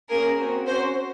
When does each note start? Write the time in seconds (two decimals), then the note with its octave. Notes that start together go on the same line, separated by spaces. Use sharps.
0.10 A#3 C#4 G#4 A#4
0.38 C4 F#4
0.67 C#4 F#4 C5